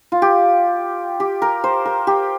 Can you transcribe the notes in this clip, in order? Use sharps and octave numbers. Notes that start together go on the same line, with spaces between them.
F4
G4
G4
A#4
C5
A#4
G4